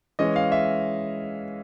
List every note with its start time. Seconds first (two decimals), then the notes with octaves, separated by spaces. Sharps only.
0.19 E3 G#3 C#4 D#5
0.36 F5
0.52 E5